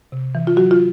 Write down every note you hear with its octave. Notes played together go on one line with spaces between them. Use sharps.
C3
E3
F4
F#3 F#4
F4